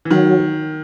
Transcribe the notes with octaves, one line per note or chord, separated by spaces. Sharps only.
E3
D#3 F#3